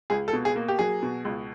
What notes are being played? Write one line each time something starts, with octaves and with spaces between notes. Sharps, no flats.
C#2 G#4
A4
B2
G#4
A#3
G4
F#3 G#4
B2
C#2